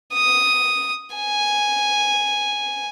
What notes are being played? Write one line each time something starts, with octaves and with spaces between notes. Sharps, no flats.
D#6
G#5